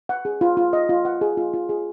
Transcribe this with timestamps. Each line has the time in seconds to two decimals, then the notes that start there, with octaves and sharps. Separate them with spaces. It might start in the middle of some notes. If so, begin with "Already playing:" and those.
0.09 F#5
0.25 G#4
0.41 F4
0.57 F4
0.73 D#5
0.89 F4
1.05 F#5
1.21 G#4
1.37 F4
1.54 F4
1.69 G#4